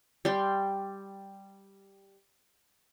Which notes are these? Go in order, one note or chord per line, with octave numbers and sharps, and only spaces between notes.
G3 G5 C6